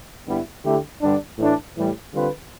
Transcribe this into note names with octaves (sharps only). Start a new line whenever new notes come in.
G2 D3 G3 B3 E4
D3 A3 E4 G4
G2 D3 G3 D4
A2 E3 A3 D4
A2 E3 G3
D3 G3 C4 F4 B4